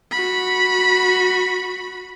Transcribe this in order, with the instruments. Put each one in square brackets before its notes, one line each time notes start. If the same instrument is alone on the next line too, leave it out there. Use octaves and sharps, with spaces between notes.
[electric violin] F#4 B5